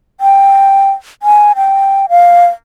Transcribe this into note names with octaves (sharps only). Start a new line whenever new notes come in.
G5
G#5
G5
F5